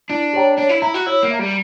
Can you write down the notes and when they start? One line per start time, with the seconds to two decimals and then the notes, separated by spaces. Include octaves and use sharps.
0.09 D4 E4
0.33 G4 C#5 G5 A#5
0.58 D4 C#5
0.69 E4
0.82 E4 E5 A#5
0.94 F#4
1.06 E4 C#5
1.23 A#3
1.31 E5 A#5
1.39 G3